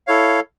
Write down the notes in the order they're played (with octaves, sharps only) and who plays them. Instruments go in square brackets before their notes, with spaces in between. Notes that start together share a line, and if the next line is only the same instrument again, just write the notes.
[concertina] E4 A4 C#5 F5